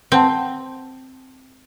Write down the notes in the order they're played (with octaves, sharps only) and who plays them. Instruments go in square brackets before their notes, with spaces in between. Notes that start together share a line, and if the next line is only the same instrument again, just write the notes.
[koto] C4 [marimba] F#5 A5